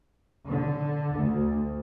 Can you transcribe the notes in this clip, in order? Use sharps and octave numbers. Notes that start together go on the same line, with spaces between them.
D3
D2